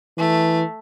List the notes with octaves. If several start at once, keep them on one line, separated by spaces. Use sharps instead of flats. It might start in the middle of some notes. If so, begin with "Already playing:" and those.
E3 A3